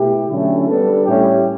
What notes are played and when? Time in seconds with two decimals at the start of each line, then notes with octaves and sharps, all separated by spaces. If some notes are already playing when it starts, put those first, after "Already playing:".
Already playing: B2 A3 E4 G4
0.29 D3 F#3 A3 C#4 E4
0.67 G3 B3 D4 A4
1.05 A2 G3 C#4 E4 G4